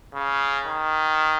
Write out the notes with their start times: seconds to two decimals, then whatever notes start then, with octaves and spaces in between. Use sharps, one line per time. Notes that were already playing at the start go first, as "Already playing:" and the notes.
0.14 C#3
0.67 D#3